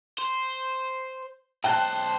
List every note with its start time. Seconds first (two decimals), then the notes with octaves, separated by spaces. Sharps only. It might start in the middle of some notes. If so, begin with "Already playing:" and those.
0.19 C5
1.64 B1 C5 G5 A5 F#6